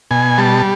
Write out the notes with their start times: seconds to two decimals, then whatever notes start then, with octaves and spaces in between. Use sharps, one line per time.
0.11 B2 G#5
0.38 G3 A5